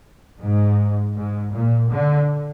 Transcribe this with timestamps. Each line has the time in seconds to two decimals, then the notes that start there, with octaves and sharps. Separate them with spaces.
0.41 G#2
1.16 G#2
1.54 A#2
1.91 D3